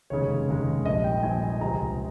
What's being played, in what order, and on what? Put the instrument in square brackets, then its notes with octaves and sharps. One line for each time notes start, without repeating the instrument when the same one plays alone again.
[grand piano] F1 D#2 C#3 G#3 C#5
F1 D#2 C#3 G#3
A#1 A#2 G3 D#5
G5
A#1 A#2 G3 G#5
G#5
C#2 C3 F3 G#3 A#5